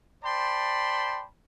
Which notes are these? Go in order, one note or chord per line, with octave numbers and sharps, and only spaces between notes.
C5 D5 G5 A5 B5 C6